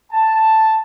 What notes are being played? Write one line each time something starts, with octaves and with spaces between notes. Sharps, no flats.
A5